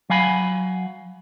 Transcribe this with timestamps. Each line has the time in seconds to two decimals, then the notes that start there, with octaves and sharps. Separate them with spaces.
0.10 F#3 F5 G#5 B5